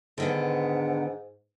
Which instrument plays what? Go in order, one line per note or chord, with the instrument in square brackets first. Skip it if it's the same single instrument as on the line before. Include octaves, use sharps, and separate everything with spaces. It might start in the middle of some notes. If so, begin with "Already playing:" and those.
[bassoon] G#2 [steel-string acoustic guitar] D3 D#3 B3